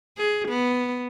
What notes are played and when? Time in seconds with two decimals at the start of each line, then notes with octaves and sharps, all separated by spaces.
0.18 G#4
0.49 B3